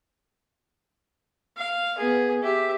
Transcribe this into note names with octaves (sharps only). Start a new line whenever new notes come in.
F5
B3 G#4
G4 E5